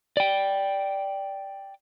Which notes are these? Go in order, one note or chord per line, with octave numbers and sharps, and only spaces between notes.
D5 G5